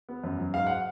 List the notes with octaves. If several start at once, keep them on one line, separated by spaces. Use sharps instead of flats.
B3
F#2
F#3
G#2 F5
F#5